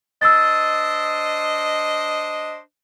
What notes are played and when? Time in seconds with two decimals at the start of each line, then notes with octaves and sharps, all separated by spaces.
0.22 D4 C5 D#5 E6 A6